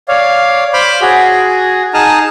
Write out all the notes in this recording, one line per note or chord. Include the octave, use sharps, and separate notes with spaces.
C#5 D5 F5
C5 B5 D6 F6
F#4 G#4
D#4 G#4 A5 D#6 F6